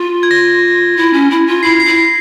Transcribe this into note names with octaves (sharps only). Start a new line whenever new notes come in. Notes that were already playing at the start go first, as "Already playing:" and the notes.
Already playing: F4
G#6
A#6
E4
C#4
E4
F4
E4 C7
C7
E4
C7